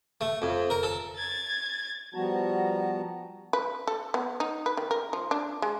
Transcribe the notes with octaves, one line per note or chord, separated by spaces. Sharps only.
A3
F2
A#4
A4
G#6 A6
F3 G3 B3 F#4 A5 A#5
B4
A4
B3
D#4
B4
D#3
A#4
F3
D4
G#3